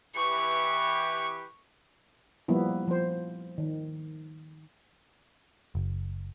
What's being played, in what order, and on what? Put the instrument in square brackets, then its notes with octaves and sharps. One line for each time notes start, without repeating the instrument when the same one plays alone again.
[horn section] E3 G4 [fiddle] C#6
[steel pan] F3 G3 A#3 B3 E4
F3 C5
D#3
[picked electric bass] F#1